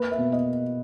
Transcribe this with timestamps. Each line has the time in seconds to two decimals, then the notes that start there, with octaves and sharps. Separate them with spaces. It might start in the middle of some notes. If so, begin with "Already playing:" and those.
Already playing: A#3 B4
0.12 E5
0.18 B2
0.32 D#5